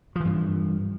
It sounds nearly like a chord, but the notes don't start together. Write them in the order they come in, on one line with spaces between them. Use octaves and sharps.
F3 E3 G2